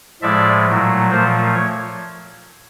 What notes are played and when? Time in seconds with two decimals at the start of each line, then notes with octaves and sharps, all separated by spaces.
0.22 A2 F3 G#3 D5 E5
0.66 A#2 F#3 A3
1.10 A#2 F3 A3 A#4 C5
1.54 C#5